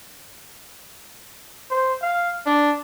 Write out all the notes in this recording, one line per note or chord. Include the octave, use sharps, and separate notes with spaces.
C5
F5
D4